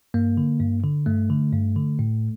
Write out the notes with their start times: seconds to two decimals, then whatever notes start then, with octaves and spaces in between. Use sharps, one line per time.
0.14 G2 A#3
0.37 D3
0.60 G2
0.84 D3
1.06 G2 A3
1.30 D3
1.53 G2
1.76 D3
1.99 A2